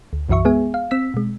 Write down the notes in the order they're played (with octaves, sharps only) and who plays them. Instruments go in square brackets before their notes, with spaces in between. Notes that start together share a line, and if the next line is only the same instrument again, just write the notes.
[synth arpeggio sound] D2
B1 F#2 E3 F#4 E5 C#6
G#3 B3 G#4 E5 G#5
F5
C4 E6 B6
B2 G#3